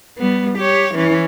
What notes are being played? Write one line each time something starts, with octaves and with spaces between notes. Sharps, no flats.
G3 B3
G4 C#5
E3 C#4